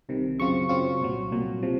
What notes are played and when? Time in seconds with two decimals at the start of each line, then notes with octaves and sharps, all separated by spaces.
0.09 C2 C3 D#3
0.39 F#2 C#3 F#3 C4 F4 C#6
0.69 F#2 C#3 F#3 C4 F4
1.00 C2 A#2 F#3
1.32 C2 A#2 F#3
1.63 C3 F3